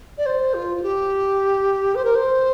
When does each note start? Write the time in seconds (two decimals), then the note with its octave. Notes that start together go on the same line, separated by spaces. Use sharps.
0.18 D5
0.26 C5
0.54 F4
0.77 F4
0.83 G4
1.95 C5
2.05 A#4
2.15 C5